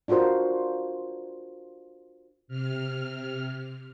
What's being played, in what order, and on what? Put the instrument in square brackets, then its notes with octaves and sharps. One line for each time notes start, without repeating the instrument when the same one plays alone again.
[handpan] D4 F4 F#4 A#4 C5
[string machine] C3 F6